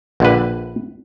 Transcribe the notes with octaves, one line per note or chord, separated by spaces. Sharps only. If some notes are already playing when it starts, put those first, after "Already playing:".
A#1 D3 B4